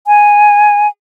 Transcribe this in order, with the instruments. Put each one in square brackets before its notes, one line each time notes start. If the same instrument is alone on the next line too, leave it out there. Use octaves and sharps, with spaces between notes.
[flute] G#5